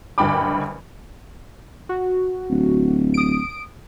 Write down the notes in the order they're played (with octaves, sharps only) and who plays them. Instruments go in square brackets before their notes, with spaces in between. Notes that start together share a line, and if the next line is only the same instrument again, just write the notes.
[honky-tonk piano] F#1 D2 G2 G5 B5 D6
[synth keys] F#4
[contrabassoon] D1
[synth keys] D#6 D7